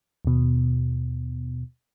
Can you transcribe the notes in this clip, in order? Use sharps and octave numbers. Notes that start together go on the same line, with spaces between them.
D#2 B2